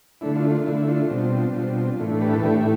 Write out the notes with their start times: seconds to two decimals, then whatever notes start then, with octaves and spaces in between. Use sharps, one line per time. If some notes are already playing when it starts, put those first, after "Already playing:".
0.21 D3 A3 D4 E4
0.36 D4 F4
0.51 D4 F4
0.66 D3 A3 D4 E4
0.88 D4 F4
1.10 B2 G3 C4
1.54 B2 G3 C4
1.99 A2 E3 A3 D4
2.21 G4 B4
2.33 A4
2.43 A2 E3 A3 D4 E4 G4